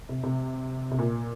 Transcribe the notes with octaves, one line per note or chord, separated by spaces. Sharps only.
C3
C3
C3
A#2